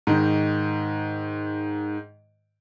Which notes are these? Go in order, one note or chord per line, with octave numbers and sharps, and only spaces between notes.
G#2 D#3